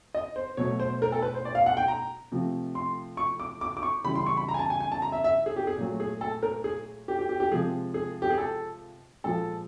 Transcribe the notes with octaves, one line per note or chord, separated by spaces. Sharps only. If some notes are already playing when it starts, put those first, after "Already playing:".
D#5
C5
B2 F#3 A3 C#5
C5
A#4
A4
B4
C5
D5
F5
F#5
G5
A#5
C3 F3 A3
C6
C#6
D6
D6
D6
C#6
C#3 E3 G3 B5
C6
C#6
B5
A#5
G#5
A5
G#5
G#5
A5
A#5
E5
E5
G#4
G4
G#4
A#2 F#3 A3
G#4
A4
A#4
G#4
G4
G4
G4
G4
C3 F3 G#3 G#4
G#4
G4
G#4
A4
A#2 F3 G#3 A4